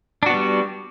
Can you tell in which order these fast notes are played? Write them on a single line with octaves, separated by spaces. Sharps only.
D4 F#4 B3 G3